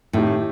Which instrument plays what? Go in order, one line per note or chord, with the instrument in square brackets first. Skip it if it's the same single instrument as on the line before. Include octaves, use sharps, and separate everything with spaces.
[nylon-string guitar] A2 [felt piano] D#3 A3 D#4 G4